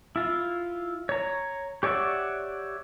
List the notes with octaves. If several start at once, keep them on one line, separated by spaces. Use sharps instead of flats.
E4 F4
C#5 A#5
G4 C#5 D5 E5 F#5